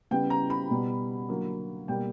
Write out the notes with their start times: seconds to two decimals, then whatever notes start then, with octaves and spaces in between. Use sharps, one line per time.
0.11 C#3 G3 B3 G5
0.30 A#5
0.50 B5
0.70 B2 G3 B3
1.29 D3 F#3 A#3
1.88 B2 G3 A#3 G5